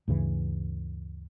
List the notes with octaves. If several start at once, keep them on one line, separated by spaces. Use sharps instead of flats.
D2 G2 C#3 E3